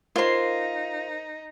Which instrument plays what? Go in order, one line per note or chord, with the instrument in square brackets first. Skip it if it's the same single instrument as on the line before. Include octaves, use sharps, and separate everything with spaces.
[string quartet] D#4 [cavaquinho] F4 C6 [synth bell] A#4 C5